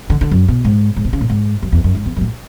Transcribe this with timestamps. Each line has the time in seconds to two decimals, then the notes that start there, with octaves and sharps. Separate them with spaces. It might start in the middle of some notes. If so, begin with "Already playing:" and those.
0.10 D3
0.21 D3
0.31 F#2
0.48 B2
0.65 G#2
0.96 G#2
1.05 B2
1.13 C#3
1.21 A2
1.30 G#2
1.62 F#2
1.72 E2
1.84 F#2
1.95 G#2
2.06 E2
2.16 F#2
2.21 A2